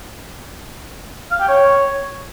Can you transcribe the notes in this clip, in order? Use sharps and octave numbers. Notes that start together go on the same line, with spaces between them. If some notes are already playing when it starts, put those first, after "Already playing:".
F5
G5
C#5